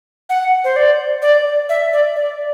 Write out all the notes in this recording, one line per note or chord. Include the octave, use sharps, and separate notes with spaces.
F#5
C5
D5
D5
E5
D5
D5